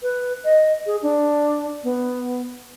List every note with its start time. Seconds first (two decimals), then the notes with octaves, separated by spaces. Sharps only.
0.03 B4
0.45 D#5
0.86 G#4
1.03 D4
1.84 B3